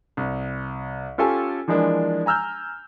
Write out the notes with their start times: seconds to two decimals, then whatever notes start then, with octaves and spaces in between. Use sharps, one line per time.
0.17 C2
1.18 C#4 F4 G4 A4 G#5
1.68 E3 F3 G#3 A#3 D4
2.26 G#5 A#5 E6 F6 G6